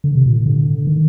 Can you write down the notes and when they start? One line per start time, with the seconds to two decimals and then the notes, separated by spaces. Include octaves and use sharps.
0.04 D3
0.15 C3
0.26 A#2
0.36 A2
0.46 D3
0.87 D#3